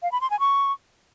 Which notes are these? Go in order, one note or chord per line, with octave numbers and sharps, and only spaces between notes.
F5
B5
C6
G#5
C#6